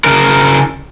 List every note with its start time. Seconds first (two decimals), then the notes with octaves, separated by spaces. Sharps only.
0.04 C#3 A#4